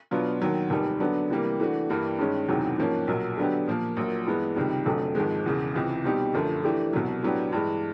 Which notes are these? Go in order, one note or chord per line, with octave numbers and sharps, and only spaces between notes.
B2 F#3 B3 D4 F4
D#2 D#3 F#3
F1 D#2 D#3 G3
D3 F#3 B3 D4
C3 E3 G3 A#3
E3 A3 D4 F#4
G2 E3 G3 A#3
G2 D#3 G#3 C#4
E1 E2 C3 D#3 F#3
G#2 F3 A#3 C#4
B1 A#2 F#3
D3 F#3 B3 D4 G4
A#2 F3 A#3
A#1 A#2 F#3
G2 E3 G#3 B3
C#2 C3 D#3 G3
F1 F2 D3 F#3 A3
G#1 G#2 F3 G#3
E1 E2 C#3
C#2 C3 E3
B2 G3 C4 D#4 G4
G1 F#2 D3 F3 A3
E3 A3 D4 G4
C2 B2 F#3
A2 F#3 B3 D4 G4
G2 E3 G#3